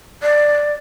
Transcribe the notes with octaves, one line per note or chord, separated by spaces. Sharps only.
D5